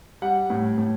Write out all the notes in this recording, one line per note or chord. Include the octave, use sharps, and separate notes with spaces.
G3 F#5
A2
A2